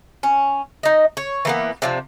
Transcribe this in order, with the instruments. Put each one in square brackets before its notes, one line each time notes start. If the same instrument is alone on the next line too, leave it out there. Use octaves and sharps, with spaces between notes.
[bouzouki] C#4
D#4 D#5
C#5
E3 A#3 B3
C3 F3 D4